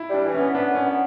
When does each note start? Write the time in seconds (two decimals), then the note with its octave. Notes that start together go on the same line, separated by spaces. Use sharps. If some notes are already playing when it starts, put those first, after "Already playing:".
Already playing: E4
0.10 G3 D4
0.25 E3
0.34 B3 C#4
0.55 B3 D4
0.70 F#2 C#4
0.86 B3